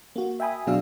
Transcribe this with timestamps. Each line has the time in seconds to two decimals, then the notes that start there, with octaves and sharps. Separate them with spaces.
0.16 A#3 F#4
0.40 E5 G5 G#5 B5 D#6
0.67 B2 F#3 D4 G#4 F5 E6